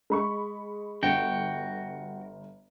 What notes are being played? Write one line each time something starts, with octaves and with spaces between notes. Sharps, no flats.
G#3 B5 C#6
G1 F#4 G5